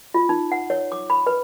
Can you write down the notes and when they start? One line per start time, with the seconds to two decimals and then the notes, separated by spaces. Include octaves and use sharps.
0.14 F4
0.29 D#4
0.52 F#5
0.70 C#5
0.92 D6
1.10 B5
1.27 B4